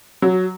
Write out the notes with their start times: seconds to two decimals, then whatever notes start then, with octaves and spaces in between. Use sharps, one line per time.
0.22 F#3